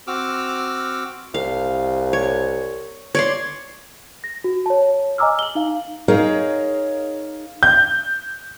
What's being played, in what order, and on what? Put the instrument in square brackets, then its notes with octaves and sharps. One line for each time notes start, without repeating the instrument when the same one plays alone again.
[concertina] C4 F#4 D6 E6 F6
[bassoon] C2 [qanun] F5
[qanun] C#5
C#5 D5 C6
[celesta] A#6
F#4
C#5 A5
D#5 G#5 A#5 D6 E6 F6
F#7 G7
D#4 F5
[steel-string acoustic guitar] D#4 G#4 A#4 C#5 F5
[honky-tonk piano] G6